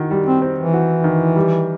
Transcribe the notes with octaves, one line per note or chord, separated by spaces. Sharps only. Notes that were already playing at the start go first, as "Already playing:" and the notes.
Already playing: D#3 F#4
G3
C4
C4
E3
F#4
D#3
G3